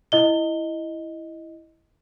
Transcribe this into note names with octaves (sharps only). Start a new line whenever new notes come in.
E4 D#5 G7